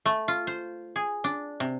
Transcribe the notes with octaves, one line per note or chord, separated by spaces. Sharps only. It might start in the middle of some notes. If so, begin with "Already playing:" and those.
A3
F4
C5
G#4
D4
C3